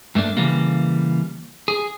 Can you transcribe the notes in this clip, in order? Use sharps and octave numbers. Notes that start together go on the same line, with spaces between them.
G2 A3 A#3 D4
C#3 E3 G3 A#3
G#4